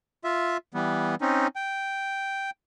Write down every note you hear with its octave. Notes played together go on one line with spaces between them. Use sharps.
F4 E5
E3 G3 B3
C4 C#4 D#4
G5